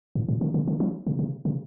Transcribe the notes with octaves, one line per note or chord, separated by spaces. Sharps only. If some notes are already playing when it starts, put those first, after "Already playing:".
G#2
A2
D3
C#3
D3
F3
C3
C3
C3